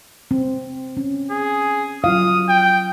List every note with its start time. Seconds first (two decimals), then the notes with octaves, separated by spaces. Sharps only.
0.31 C4
0.97 C#4
1.31 G#4
2.04 F#3 F4 F5 D#6
2.49 G5